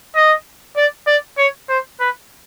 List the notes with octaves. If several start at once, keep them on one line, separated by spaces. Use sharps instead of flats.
D#5
D5
D5
C#5
C5
B4